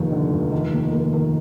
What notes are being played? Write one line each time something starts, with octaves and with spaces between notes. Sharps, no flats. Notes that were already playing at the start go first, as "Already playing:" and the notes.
Already playing: F1 D#2 D#3
D3
F1
D#3
A#3
A#3
D#3